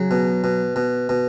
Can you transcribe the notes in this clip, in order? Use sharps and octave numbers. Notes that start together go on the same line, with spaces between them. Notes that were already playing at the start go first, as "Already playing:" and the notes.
Already playing: C#3 F#3
B2
B2
B2
B2